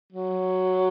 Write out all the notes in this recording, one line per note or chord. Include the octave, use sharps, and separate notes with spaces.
F#3